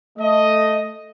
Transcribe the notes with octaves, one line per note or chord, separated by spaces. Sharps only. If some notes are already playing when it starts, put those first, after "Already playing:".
A3 D#5